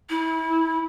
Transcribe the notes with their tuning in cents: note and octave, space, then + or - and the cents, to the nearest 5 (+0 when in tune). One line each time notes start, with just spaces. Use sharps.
E4 -25